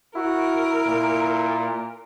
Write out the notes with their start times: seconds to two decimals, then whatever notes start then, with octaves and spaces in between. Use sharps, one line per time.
0.16 E4 F#4 A#4
0.87 A#2